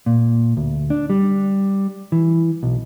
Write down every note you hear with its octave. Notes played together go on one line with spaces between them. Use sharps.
A#2
D2
D4
G3
E3
B1